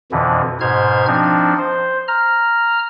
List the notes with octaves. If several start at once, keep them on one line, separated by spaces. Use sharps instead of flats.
F2 B2 D3 E3
G#2 B2 C5 F6 G#6
F3 C4 D4 D#4
C5
A#5 F6